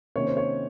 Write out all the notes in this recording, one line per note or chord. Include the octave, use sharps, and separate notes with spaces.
C3 D#3 A#3 C#4 C#5
C5
C#5